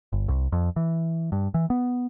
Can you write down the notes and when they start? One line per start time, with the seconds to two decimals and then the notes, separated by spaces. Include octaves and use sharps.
0.13 G1
0.28 C2
0.52 F2
0.76 E3
1.32 G2
1.54 E3
1.70 B3